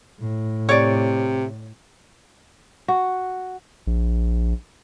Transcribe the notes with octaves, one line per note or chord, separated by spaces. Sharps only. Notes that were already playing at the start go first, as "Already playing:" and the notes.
A2
C3 C#5 D5
F#4
A#1